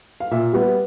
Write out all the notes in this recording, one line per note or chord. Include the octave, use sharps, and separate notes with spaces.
F5
A#2 E5
G3 B3